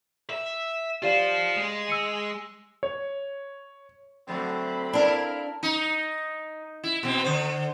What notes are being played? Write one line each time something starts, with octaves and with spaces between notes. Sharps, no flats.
E5
F4 G4 C5 D5 F5
G#3
E6 C#7 D#7
C#5
D3 F#3 A3 C4 B5
D4 E4 A#4 F5
D#4
E4
B2 C4
D3 C5